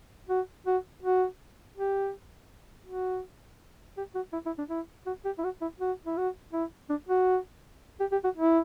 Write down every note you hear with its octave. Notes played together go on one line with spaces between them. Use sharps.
F#4
F#4
F#4
G4
F#4
G4
F#4
E4
E4
D4
E4
F#4
G4
E4
F#4
E4
F#4
E4
F#4
E4
D4
F#4
G4
G4
F#4
E4